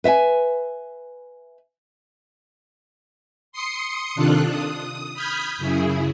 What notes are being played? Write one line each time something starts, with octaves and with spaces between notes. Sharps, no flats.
B4 E5 F#5 G#5
C6 D#6 C7 C#7
C3 D#3 D4 F4 A4 F#6
D#6
B5 D#6 F6 G6 G#6 B6
F#2 C#3 E4 G#4